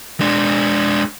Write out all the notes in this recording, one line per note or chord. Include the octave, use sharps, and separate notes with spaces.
G#3 D4